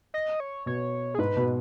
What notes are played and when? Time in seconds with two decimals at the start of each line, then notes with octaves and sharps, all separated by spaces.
0.14 D#5
0.40 C#5
0.66 B2 C#5
1.14 G#4
1.19 G#2 B4
1.37 B2